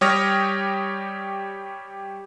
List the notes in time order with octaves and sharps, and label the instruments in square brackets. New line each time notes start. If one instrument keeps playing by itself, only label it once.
[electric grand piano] G3 G4 C#5 D#6 F6 A#6